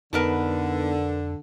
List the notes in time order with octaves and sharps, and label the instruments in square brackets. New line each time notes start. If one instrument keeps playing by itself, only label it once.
[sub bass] F2 [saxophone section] D3 [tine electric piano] B3 D#4 [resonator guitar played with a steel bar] A#4 B4 A5